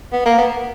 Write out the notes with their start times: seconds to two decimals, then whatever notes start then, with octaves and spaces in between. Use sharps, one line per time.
0.13 B3
0.25 A#3
0.38 B3